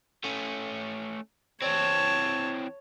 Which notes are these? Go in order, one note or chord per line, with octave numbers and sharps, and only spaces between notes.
A3 C#4
E3 C4 C#5 A5